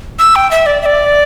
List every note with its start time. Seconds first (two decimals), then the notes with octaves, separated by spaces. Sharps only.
0.19 E6
0.36 G5
0.51 E5
0.66 D5
0.82 E5
0.86 D5